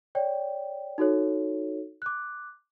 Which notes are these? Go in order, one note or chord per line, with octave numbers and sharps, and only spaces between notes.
C#5 D5 G5
D#4 F#4 A4 C#5
D6 F#6